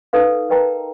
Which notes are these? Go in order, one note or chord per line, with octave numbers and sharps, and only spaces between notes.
D#4 A4 B4 F5
A#4 B4 D#5 G5 A5 A#5